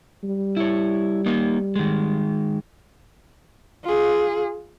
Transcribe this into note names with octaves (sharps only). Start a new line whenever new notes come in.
G3
E4 C#5
A#3 D#4
D#3 G#3
F4 G#4